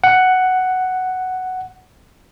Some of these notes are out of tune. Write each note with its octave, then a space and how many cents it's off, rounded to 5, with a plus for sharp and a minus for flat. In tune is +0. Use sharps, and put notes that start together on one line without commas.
F#5 +5